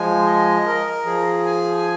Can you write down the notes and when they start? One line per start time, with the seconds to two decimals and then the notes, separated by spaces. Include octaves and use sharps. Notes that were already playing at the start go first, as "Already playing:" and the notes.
Already playing: F3 G#3 G#5
0.26 D#5
0.66 A#4
1.05 F3 G#4
1.46 G#5